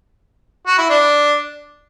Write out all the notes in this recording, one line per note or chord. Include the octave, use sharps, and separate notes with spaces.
F#4
E4
D4